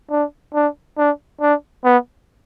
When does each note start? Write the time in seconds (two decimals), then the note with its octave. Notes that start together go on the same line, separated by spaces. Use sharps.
0.11 D4
0.54 D4
0.98 D4
1.41 D4
1.84 B3